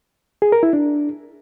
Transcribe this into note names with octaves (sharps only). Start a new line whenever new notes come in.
G#4
A#4
E4
D4